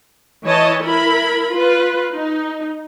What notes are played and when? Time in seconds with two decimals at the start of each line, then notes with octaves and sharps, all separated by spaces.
0.45 E3 C#5 D#5 A5
0.84 E4 A#4 B5
1.51 F4 B4
2.13 D#4